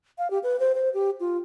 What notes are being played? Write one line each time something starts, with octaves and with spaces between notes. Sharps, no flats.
F5
G4
B4
C5
C5
G4
F4